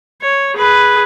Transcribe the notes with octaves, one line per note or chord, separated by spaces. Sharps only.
C#5
G#4 B4